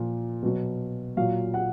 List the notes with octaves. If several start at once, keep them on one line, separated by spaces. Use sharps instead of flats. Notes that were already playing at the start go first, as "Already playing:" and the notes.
Already playing: A#2 F3
B2 F#3
A#2 F#3 F5
F#5